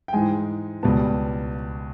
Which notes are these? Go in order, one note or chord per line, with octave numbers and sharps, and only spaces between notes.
G5
G#2 E3 G#3 G#5
C#2 B2 G3 B3 A5